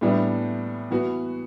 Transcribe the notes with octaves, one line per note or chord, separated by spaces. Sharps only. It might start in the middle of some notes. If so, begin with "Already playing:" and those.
A2 E3 G3 B3 D4
E3 B3 F#4